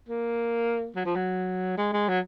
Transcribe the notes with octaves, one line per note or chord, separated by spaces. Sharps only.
A#3
F#3
F3
F#3
G#3
G#3
F#3